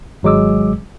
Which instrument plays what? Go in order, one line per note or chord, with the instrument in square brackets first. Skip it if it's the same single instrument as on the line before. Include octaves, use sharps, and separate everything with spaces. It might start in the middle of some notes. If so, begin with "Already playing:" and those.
[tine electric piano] G#1 F#3 G#3 D6 E6